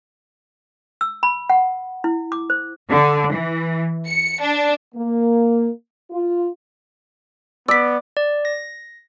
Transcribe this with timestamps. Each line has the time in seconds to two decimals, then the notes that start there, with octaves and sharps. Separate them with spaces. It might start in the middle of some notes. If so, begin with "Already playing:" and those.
1.01 E6
1.23 B5
1.50 F#5
2.04 E4
2.32 D6
2.50 C5
2.90 D3
3.33 E3
4.07 C#7
4.41 D4
4.95 A#3
6.11 F4
7.68 B3 D5 E6 B6
8.17 D5
8.45 A#6